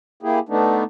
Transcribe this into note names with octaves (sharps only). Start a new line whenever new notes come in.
A#3 E4 G4 G#4
D3 A3 B3 D4 D#4